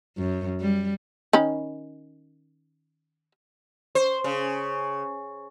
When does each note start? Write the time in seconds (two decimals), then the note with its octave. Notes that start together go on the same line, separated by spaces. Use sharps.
0.17 F#2
0.60 G3
1.33 D#3 C#4 B5
3.95 C5
4.24 C#3